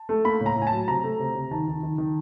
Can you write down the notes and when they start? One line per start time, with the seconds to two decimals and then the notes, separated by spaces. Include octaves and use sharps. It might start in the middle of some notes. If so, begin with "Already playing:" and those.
Already playing: A5
0.09 A3
0.25 A#3 B5
0.41 A2
0.46 A#5
0.56 A2
0.62 G#5
0.67 F#3 A5
0.88 C3 A#5
1.04 A3
1.20 C3
1.35 C3
1.51 D#3 A5
1.68 D#3
1.83 D#3
1.98 D#3